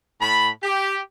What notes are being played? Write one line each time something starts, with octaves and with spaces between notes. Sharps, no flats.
A2 A5 B5
G4